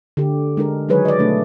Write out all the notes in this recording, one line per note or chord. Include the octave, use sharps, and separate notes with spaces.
D3 G4
G#3 D4 A#4
D#3 F#3 G#3 G#4 B4 C#5
D5 D#5
B2 A3 D4